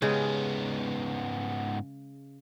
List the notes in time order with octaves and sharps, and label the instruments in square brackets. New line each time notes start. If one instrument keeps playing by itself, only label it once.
[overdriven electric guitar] G#2 B3 [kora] C#3 G#3 G4